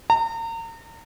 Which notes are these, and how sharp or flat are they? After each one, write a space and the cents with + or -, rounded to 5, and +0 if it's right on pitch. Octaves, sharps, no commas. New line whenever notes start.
A#5 -35